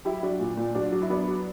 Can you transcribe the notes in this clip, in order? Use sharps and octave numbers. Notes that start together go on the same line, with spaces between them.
F#3 E4 G4
F#3 D4 F#4
A#2
A#2
F#3 D4 F#4
F#3
E4
F#3 B3 D4
F#3